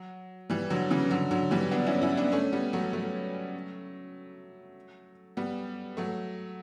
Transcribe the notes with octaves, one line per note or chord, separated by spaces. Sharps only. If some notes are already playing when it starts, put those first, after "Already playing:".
Already playing: F#3
E3 G3
D3 F#3
C#3 E3
D3 F#3
D3 F#3
E3 G3
B3 D4
C#4 E4
C#4 E4
B3 D4
A3 C#4
G3 B3
F#3 A3
F#3 A3
G3 B3
F#3 A3